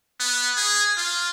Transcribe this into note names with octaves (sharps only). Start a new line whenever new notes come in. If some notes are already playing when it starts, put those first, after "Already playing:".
B3
G#4
F4